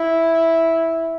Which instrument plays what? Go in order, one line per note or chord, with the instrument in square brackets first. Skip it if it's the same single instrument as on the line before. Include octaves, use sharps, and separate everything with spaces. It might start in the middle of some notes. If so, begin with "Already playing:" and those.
Already playing: [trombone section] E4